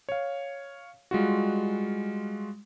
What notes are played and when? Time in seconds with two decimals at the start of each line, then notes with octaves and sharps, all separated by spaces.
0.09 C#5 F5
1.11 G3 G#3 F4 F#4